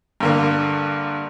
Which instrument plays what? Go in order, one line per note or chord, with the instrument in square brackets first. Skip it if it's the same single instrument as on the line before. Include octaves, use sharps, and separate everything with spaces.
[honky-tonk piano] G2 D3 A#3